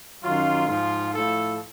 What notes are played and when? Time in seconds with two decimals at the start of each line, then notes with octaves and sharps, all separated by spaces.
0.22 F#2 D#3 F#3 F4
0.67 G#2 F3 F4
1.13 A2 F3 A4